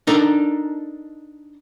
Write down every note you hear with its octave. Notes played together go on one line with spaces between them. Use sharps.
D4 D#4 A4 A#4 D#5